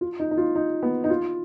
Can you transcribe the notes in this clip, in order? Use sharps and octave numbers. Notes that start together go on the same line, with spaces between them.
F4
D#4
D#4
F4
D#4
B3
D#4
F4